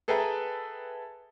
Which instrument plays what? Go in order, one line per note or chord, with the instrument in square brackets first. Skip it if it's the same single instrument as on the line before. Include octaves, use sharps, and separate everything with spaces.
[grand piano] G#4 A4 B4 E5 G5 A#5